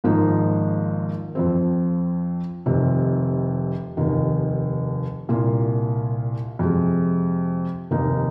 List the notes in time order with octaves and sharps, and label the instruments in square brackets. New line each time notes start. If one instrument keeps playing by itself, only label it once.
[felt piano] G#1 G#2 F3 A#3 D#4
F2 F3 C4
F1 F2 C3 D#3
F1 D#2 D#3
C2 A#2 A#3 F4
F2 C3 G#3
F1 D#2 D#3 A#3 D#4